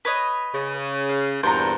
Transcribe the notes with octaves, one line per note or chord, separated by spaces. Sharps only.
B4 C#5 D#5
C#3
F5
E2 G2 A#2 C5 A#5